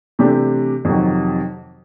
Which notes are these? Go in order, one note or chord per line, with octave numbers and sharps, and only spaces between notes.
C3 E3 A3 D4 G4
F2 C3 D#3 F#3